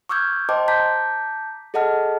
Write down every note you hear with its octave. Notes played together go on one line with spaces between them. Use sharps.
C#6 D6 E6 F6 G6 G#6
C5 D#5 G5 A5 C6 D6
A5 A#5 D6 G6 B6
G#4 A4 D#5 F#5 A5 F6